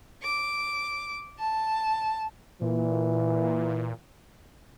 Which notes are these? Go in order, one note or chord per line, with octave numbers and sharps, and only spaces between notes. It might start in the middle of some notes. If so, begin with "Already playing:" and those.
D6
A5
A#2 E3